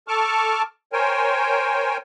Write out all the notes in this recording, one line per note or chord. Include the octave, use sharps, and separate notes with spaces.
A4 A5 C#6 D6 F6
A#4 C5 C#5 G5 G#5